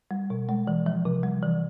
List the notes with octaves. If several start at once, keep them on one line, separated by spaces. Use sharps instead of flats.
G3
B2
G#3
E3
F3
C3
G3
E3